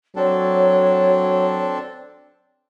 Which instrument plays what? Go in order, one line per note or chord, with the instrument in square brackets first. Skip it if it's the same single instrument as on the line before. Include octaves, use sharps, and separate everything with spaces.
[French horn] F#3 [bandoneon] C4 D4 A4 [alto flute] C#5